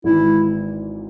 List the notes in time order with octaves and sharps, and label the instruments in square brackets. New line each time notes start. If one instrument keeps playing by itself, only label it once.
[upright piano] G#1 G#2 E3 [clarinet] E4